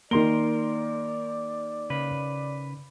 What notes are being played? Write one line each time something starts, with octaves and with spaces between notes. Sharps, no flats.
D#3 A#3 A#4 D5 C6 G7
C#3 B4